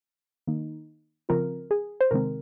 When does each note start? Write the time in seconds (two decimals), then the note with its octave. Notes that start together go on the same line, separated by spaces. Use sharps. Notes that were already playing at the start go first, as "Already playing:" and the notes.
0.47 D#3 A#3 D#4
1.29 C#3 F3 C4 F4 A#4
1.71 G#4
2.01 C5
2.11 C3 D#3 G#3 C4 A#4